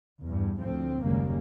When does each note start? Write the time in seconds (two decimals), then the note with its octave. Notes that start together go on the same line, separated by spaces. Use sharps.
0.22 E2 G2
0.61 D2 A2 F3 C4
1.03 F#1 D#2 C#3 G3 G#3 A#3